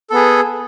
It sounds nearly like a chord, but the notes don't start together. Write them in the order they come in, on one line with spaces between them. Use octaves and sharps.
A4 B3 G#4